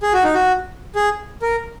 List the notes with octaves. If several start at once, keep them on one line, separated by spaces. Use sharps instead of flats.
G#4
F#4
D#4
F#4
G#4
A#4